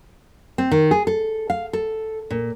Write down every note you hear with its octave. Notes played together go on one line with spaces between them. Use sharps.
C4
D#3
G#4
A4
F5
A4
A#2